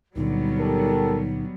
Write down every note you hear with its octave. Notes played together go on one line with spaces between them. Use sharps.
C#2 A#2 D3 F#3 G3 B3 D#4
G4 A4 A#4